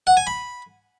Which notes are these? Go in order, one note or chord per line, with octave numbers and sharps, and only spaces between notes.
F#5
G#5
B5